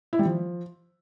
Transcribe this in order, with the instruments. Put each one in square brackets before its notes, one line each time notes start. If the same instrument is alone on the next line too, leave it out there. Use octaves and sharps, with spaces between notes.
[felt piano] E4
G3
F3